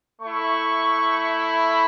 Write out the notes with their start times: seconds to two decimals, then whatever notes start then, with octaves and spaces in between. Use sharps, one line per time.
0.22 A3 E4 C#6
1.51 B5